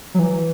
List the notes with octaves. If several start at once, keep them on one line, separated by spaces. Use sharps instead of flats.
F#3
E3